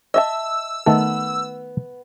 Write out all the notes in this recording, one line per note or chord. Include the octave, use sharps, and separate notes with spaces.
D#5 E5 A5 E6
D#3 A3 B3 A4